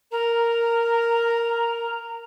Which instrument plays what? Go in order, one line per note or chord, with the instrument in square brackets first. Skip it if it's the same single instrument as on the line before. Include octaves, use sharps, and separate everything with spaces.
[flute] A#4 [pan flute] A#5